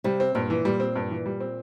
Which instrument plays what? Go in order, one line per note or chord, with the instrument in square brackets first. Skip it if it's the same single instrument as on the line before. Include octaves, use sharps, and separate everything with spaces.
[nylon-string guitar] C3 [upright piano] G3
[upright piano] C4
[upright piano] G2 [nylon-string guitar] A#2
[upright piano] E3
[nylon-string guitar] A#2 [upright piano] G3
[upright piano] C4
G2
E3
G3
C4